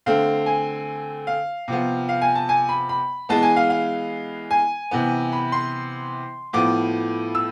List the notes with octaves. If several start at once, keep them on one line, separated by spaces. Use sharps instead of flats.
D3 A3 C4 F5
G#5
F5
C3 F3 B3
F5
G#5
A5
G#5
B5
B5
E3 G#3 B3 A5
G#5
F5
F5
G#5
C3 E3 B3
B5
C6
A2 F3 B3 D6
E6